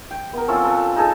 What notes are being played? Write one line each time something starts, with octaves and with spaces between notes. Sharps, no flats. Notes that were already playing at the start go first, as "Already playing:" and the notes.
G5
B3 A#4
F3 C4 C#4 A4
A4 B4
D#4 G#4 A4 A5